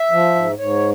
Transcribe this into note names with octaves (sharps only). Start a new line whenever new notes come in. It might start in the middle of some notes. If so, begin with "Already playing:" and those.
Already playing: E5
F3
G#2
G#2 C#5